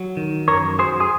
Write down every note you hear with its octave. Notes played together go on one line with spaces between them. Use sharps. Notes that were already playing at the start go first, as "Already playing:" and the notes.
Already playing: F#3
D#3
F#2 A#4 C#5
F#3 G#4 C5
G#4